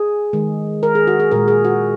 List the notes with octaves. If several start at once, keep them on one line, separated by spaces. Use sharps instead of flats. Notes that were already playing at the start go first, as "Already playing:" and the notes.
Already playing: G#4
D#3 G#3
A#4
G#4
F#4
G#4
A#2 G#3 A#4
G#4
F#4